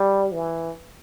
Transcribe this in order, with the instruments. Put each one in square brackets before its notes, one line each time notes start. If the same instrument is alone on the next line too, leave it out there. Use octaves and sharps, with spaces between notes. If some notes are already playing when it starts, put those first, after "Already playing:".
Already playing: [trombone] G3
E3